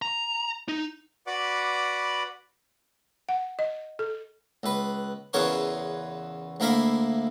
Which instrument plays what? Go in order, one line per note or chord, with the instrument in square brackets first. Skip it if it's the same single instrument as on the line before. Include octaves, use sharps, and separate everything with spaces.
[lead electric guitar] A#5
D#4
[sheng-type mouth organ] F#4 B4 D5 F#5 B5 D6
[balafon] F#5
D#5
A4
[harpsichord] C#2 B4
E2 C#3 E3 A#4 C#5 C6
D2 A#3 E4 A#4 E5 F5